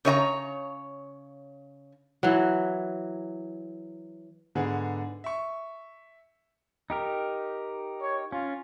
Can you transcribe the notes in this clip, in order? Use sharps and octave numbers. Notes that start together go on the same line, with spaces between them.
C#3 C#5 D#5 A#5
E3 F#3
G#2 D3 B3 G#4
E5 C#6
D#4 G4 A#4
C#5
C#4 F4